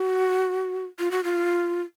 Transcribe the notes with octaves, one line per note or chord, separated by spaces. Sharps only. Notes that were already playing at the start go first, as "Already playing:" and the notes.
Already playing: F#4
F4
F#4
F4